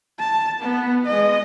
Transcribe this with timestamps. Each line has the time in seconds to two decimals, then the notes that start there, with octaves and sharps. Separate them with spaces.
0.19 A5
0.61 B3
1.06 G#3 D#5